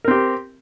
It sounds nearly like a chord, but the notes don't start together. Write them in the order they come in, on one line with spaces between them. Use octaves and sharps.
A#4 C4 G4